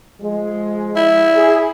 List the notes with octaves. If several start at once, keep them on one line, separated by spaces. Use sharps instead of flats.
F3 G#3
E4
G#4